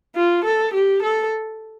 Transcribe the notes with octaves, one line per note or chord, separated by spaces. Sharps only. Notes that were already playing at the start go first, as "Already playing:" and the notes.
F4
A4
G4
A4